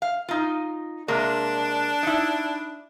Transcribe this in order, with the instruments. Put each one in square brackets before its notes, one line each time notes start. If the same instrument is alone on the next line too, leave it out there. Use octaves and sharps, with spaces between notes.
[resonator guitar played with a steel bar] F5
D#4 F4
[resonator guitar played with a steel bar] C3 G#3 A#3 [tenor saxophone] D4
[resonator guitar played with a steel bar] D#4 E4